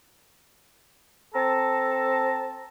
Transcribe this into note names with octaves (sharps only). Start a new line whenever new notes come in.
C4 A4 A5 A#5